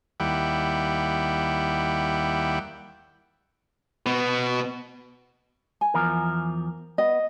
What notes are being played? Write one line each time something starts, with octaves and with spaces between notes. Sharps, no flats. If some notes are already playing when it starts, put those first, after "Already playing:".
D#2 G3 E4 F#5 G5
B2 B3
G#5
E2 F3 A#4
B3 D#5